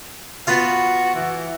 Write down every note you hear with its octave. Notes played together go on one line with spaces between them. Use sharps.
B3 F4 F#4 F5
E3